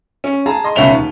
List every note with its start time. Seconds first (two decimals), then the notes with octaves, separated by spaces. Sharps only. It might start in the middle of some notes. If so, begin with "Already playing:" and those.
0.24 C#4
0.46 G#4 A5 A#5
0.64 D#5 C6
0.76 C#2 B2 C#4 E5 F7 G7
0.90 D#2